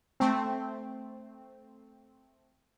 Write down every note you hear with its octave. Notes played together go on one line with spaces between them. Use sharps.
A3 C4